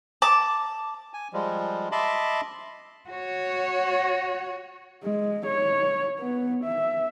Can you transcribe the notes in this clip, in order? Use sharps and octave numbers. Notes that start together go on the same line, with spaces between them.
A5 D6
G#5
F3 G3 G#3
D#5 E5 A5 B5 C6 D6
F#4 C#5
G#3
C#5
B3
E5